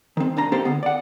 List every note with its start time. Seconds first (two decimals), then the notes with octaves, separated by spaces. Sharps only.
0.17 D#3 C4
0.37 C2 D4 A#5
0.52 A#3 C4 D#4 G4 A4 C5
0.65 D3 B3
0.83 D5 F#5